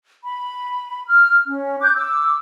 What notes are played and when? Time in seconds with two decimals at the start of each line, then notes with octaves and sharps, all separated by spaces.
0.24 B5
1.07 F6
1.46 C#4
1.81 D6 F#6 G6
1.95 D6 E6